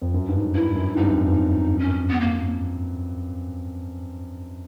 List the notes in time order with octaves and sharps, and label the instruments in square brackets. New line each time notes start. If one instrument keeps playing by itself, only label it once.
[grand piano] F2
F#2
G2
G#2
[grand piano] G2 [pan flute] E4
[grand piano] F#2
[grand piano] G2 [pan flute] D#4
[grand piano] F#2
F2
F#2
[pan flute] C#4
B3
A#3